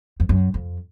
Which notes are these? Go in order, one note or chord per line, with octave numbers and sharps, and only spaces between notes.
F2
F#2
F2